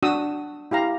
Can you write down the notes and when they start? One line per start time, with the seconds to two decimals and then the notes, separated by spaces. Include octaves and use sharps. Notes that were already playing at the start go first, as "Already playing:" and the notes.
0.03 D4 F#4 D#6 E6
0.71 E4 G4 F5 A#5